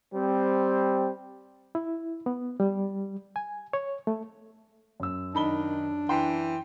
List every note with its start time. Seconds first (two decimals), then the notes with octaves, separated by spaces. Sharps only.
0.14 G3 C4
1.75 E4
2.26 B3
2.60 G3
3.36 G#5
3.73 C#5
4.07 A3
5.00 F#2 E6
5.35 D#3 D4 D#4 B5 G7
6.09 E3 G5 C6